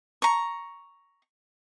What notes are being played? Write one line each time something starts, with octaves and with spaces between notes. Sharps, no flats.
A#5 C#6